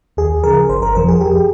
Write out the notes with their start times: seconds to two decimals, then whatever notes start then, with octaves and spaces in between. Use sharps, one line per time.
0.17 D#2 G#4
0.43 C#3 F3 A#4
0.69 G1 C5
0.82 A#4
0.95 F2 C3 F3 A#4
1.08 G#4
1.21 F2 G4